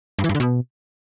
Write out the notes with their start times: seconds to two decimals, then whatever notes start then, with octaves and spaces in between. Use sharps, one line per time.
0.19 G2
0.24 E3
0.29 G2
0.35 D3
0.40 B2